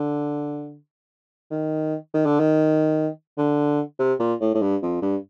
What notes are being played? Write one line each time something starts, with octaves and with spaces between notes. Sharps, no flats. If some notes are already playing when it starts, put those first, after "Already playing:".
Already playing: D3
D#3
D#3
D3
D#3
D3
C3
A#2
A2
A2
G2
F2
G2